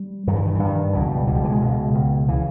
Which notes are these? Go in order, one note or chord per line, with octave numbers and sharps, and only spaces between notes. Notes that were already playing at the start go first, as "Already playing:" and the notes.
Already playing: G3
G2 D#3
E3
D#3
E3
G2
D#3
C#2 B2 E3
G3
C#2 B2 E3 G3
E3
G#3
C#2 B2
C#2 B2
C#3 E3